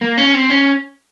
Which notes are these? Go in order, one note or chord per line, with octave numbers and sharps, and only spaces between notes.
A#3
C#4
C4
C#4